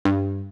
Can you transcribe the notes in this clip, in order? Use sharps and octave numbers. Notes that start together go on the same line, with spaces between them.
G2